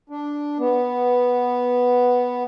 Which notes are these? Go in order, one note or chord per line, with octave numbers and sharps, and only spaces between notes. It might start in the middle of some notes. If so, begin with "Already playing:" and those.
D4
B3